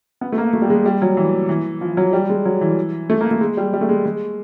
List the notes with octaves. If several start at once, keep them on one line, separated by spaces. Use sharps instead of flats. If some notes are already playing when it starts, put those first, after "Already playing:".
B3
A3
A#3
A3
G3
G#3
G3
F#3
E3
E3
F3
F#3
G3
G#3
F#3
E3
A3
A#3
A3
G#3
G3
G3
A3
G#3
G#3